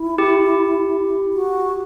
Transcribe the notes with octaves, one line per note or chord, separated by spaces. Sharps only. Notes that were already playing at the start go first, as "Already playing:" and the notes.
Already playing: E4
G4
F#4